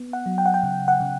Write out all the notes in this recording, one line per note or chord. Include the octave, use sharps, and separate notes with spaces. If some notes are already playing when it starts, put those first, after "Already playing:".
Already playing: B3
F#5
F#3
G5
F#5
G5
C#3
F#5
C#3